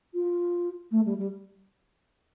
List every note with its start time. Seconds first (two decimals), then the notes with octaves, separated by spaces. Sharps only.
0.14 F4
0.91 A3
1.05 G3
1.17 G3